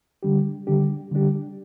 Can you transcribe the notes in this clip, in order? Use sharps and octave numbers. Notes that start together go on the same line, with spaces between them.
D3 G3 D4 G4
D3 G3 D4 G4
D3 G3 D4 G4